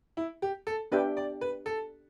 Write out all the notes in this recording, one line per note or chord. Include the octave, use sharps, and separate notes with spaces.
E4
G4
A4
B3 D4 G4 B4 E5 G5
D5
B4
A4